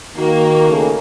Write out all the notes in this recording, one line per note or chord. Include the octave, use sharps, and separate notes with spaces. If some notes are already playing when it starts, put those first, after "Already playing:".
D#3 A#3 F#4
C#3 A3